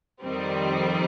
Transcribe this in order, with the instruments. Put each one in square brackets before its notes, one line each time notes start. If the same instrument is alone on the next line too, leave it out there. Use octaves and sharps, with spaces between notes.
[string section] F2 D#3 G3 C4